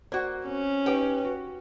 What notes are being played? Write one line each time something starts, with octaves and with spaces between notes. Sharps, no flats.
A#3 F#4 C5 D5
C4 C#4
D#4 G4 B4 C#5 G5
F#4